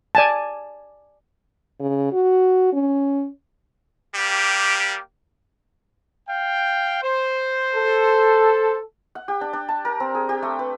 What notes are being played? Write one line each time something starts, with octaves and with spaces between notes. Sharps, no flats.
D5 G#5 A5
C#3
F#4
C#4
G3 A#3 G4
F5 G5
C5
A4
F#5
G4
D4
D4
A5
A#4
C4
G#4
G4
A3
B4